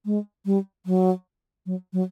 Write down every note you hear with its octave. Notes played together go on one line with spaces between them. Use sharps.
G#3
G3
F#3
F#3
F#3